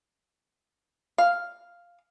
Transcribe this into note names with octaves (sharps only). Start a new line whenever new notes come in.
F5